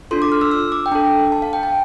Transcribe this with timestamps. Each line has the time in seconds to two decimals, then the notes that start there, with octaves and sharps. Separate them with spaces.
0.11 D4 F4 A4 C6
0.22 D6
0.32 F6
0.41 E6
0.51 E6
0.72 D6
0.86 G5
0.92 D4 A4 A5
1.32 A5
1.42 F5
1.53 G5
1.63 A5